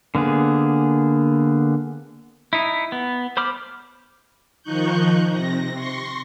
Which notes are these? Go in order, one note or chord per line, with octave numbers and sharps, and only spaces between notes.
D3 A#3 B3 G#4
D#4 E4
B3
C5 B5 D6 F6
D#3 F3 D#4 C#6 F#6 G6
C3 A#6
C6 C#6 A#6